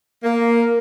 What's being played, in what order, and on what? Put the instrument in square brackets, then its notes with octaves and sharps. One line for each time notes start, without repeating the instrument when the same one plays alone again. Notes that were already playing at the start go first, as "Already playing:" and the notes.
[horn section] A#3